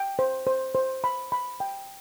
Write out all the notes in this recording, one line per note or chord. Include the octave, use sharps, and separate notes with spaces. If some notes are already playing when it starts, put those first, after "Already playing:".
Already playing: G5
C5
C5
C5
B5
B5
G5